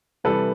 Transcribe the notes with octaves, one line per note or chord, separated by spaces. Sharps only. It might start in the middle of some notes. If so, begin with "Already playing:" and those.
C3 E3 G3 A4 B4